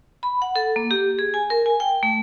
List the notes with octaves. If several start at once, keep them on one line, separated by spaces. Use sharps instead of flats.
B5
F#5
A4
A#3
G4
G#4
G#5
A#4
G#5
G5
A3